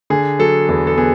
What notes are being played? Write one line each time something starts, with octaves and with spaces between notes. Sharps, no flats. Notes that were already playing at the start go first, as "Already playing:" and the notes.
D3 G#4
F#3 A4
E2 A4
A4
B3 G#4